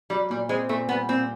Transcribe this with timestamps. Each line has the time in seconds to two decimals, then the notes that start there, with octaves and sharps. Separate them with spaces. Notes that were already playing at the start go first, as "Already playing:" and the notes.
0.10 F#3 G3
0.30 A#2 G3
0.49 G#3 C4
0.69 A#2 A3
0.89 G3 B3
1.09 A#2 C4